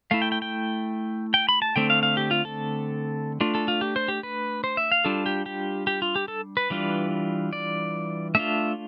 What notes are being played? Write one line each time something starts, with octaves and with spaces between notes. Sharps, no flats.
A3 E4 F5
G5
G5
G5
G5
B5
A5
D3 A3 C4 G5
F5
F5
G4
F4
A4
A3 D4 F4
A4
F4
G4
C5
G4
B4
C5
E5
F5
G3 D4 F4 A4
G4
G4
G4
F4
G4
A4
B4
E3 G3 D4 F4
D5
A3 D4 F4 E5